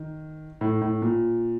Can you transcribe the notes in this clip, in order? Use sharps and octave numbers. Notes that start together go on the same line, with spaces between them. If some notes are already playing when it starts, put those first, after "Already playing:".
Already playing: D#3
A2
A2
A#2